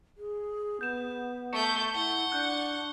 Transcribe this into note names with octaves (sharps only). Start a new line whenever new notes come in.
G#4
B3 G6 E7
A3 C#6 G6 C#7 E7
E4 F#5 G7
D4 F#6 G6